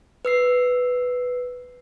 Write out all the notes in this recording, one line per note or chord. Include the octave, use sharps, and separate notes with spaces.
B4 E6 C7